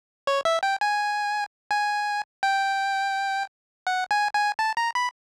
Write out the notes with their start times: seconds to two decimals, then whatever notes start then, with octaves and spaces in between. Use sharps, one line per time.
0.27 C#5
0.45 E5
0.63 G5
0.81 G#5
1.71 G#5
2.43 G5
3.87 F#5
4.11 G#5
4.34 G#5
4.59 A5
4.77 A#5
4.95 B5